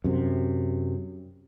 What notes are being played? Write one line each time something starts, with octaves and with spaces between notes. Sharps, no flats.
F#2 C3